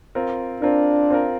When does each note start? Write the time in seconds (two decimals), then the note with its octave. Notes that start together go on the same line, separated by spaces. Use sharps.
0.15 C4 F4 A#4
0.62 C4 D4 F4 A#4
1.10 C4 F4 A#4